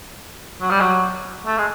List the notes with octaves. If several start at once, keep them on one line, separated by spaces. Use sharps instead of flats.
F#3
G3
F#3
A3
G#3